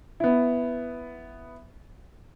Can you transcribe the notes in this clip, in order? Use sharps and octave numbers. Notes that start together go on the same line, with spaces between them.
B3 E4